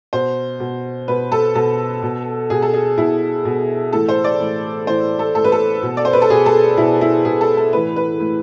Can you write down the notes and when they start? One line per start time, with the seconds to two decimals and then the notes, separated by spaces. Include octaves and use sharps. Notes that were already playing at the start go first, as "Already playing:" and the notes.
0.13 B2 C5
0.60 B2
1.08 B2 B4
1.32 A4
1.55 B2 A4
2.03 B2
2.50 B2 G#4
2.62 A4
2.74 G#4
2.98 B2 E4
3.45 B2
3.93 A2 E3 A4
4.09 C5
4.24 D5
4.40 A2 E3
4.87 A2 E3 C5
5.19 A4
5.35 A2 E3 A4
5.44 B4
5.52 A4
5.83 B2
5.97 D5
6.05 C5
6.13 B4
6.22 A4
6.30 B2 G#4
6.46 A4
6.77 B2 E4
7.01 E4
7.25 B2 G#4
7.41 A4
7.57 A4
7.73 A2 E3 B4
7.96 B4
8.20 A2 E3